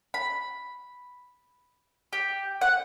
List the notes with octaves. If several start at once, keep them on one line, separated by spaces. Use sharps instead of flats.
B5
G4
F#5